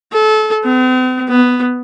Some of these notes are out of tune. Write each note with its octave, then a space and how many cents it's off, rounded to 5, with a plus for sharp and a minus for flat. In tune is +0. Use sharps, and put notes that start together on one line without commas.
A4 -30
C4 -45
B3 +5